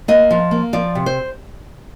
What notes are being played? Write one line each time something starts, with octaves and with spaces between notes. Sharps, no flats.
A#3 D#5
F3
A#3
F3 D5
C3
C5